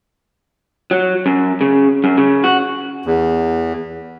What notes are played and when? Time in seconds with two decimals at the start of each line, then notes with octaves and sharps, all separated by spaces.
0.91 F#3
1.26 F#2
1.61 C#3
2.04 F#2
2.17 C#3
2.44 F#4
3.06 E2